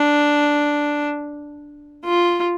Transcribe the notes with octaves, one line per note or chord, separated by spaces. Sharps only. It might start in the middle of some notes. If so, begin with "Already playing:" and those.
Already playing: D4
F4